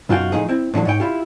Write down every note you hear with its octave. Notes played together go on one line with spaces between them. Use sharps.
B1 F#2 F4 F#4 F5 G5
A2 F3 D#4 G#4
C4 E4
A2 D3 D#3 F3
G#2 C#5 G5
E4 F4 G4